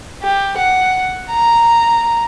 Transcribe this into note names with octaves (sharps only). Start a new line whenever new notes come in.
G4
F#5
A#5